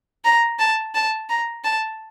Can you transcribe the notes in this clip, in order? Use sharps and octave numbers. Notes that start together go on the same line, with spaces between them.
A#5
A5
A5
A#5
A5